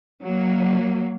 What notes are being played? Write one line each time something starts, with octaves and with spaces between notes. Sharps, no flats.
F#3 A#3